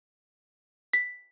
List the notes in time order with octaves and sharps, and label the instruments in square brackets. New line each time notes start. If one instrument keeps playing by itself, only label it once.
[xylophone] B6